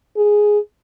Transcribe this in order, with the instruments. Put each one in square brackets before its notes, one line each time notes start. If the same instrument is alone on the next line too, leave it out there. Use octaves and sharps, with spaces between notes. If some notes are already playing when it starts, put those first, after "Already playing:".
[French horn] G#4